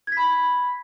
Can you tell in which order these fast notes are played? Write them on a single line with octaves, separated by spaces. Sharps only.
G#6 B6 B5